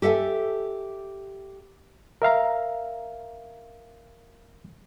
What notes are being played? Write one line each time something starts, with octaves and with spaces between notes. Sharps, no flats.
G4 A4 E5 F#5 G#5
A#4 E5 F5 A#5